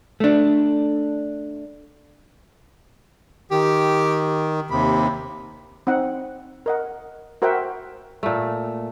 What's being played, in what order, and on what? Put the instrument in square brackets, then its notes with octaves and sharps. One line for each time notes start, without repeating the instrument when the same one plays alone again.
[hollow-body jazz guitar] A3 D4
[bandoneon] D#3 [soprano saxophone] G4
[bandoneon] D#2 C3 [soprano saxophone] B5
[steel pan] C4 D#4 F#5
A#4 D#5 F#5
F#4 A#4 C5 E5 F#5 G5
[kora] A#2 A3